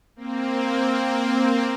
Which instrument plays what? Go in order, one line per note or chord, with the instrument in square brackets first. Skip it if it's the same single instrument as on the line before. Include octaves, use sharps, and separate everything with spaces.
[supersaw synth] A#3 C4